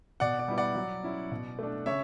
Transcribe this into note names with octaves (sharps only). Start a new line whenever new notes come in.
B2 D5 F#5
D5
G3 B3 E4
D5 F#5
F#3
C#4 E4
B2
A3 D4
C#3 C#5 E5